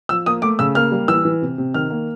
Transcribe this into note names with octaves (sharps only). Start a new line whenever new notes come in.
F3 E6
A#3 D#6
A3 D6
C#3 E6
A#3 F6
G3
E3 E6
E3
C3
C3
D#3 F6
A#3